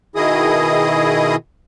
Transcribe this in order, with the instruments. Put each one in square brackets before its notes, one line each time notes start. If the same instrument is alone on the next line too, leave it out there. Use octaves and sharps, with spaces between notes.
[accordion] B2 D#3 E4 G#4 D#5 D#6